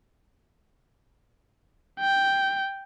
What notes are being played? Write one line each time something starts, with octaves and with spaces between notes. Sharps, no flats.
G5